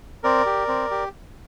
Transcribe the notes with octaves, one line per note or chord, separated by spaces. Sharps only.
C4 A#4 D5
G4
C4
G4